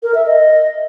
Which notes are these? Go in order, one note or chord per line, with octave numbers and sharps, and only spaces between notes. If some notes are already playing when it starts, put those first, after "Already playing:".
A#4
E5
D#5